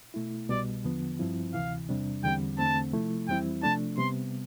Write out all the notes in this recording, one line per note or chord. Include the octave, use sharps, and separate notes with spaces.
B2 A3 E4
C2 B2 G3 D5
E2 D3 F3 B3
G2 F3 C4 E4
D2 C3 E3 F5
E2 C3 G3 D4
E2 D3 G3 C4 G5
E2 D3 A3 C4 A5
C3 F3 A3 E4
F2 E3 G3 C4 E4 G5
C3 F3 A3 D4 A5
C3 G3 B3 C6